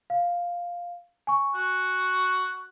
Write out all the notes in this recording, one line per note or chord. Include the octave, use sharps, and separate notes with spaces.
F5
G#5 C#6
F#4